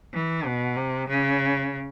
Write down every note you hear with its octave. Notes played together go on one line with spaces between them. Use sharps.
E3
B2
C3
C#3